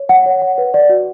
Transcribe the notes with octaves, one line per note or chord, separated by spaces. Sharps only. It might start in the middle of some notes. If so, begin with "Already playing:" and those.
Already playing: C#5
F#5
C#5
F#5
B4
D5
F#4